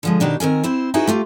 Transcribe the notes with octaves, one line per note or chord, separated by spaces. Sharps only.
D3 F3 G#3
B2 D#3 D4 G4
D#3 C4 A#4 G#5
C4 E4 C5
D#4 E4 F#4 G#4 B4
A3 F4 G4